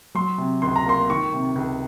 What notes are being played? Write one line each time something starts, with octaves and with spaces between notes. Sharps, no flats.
F#3 C6
C3
C#2 C6
A#5
A#3 C6
D#3 C#6
C3
C#2